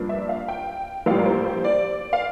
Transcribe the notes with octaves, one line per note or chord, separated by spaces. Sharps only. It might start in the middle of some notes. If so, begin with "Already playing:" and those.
Already playing: G2 F3 A#3 D4
E5
F5
G5
A#1 A2 G3 F5
A#4
C5
C5
D5
F5